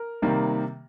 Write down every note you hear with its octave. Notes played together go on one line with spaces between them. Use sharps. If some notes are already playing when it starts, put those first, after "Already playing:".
Already playing: A#4
C3 D#3 G3 A#3